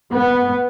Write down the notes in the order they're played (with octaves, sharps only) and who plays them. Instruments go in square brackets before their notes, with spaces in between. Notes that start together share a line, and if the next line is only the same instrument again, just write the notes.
[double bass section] B3